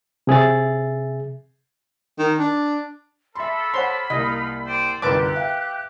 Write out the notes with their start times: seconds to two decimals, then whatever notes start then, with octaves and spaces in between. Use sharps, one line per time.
0.27 C3 G#4 E5 A6
2.19 D#3
2.39 D4
3.35 A#3 A4 E5 B5 C6
3.74 C5 C#5 F#5 C6
4.10 C2 A#3 D#4 F4 D#5
4.66 C5 D5 G5
5.02 G1 C2 F#2 G4 B4 A5 D6 F#6
5.35 E5 F5 G5